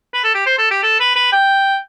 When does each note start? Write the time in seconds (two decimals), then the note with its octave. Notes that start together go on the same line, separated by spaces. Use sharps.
0.13 B4
0.24 A4
0.34 G4
0.46 C5
0.58 A4
0.71 G4
0.83 A4
1.00 B4
1.16 B4
1.32 G5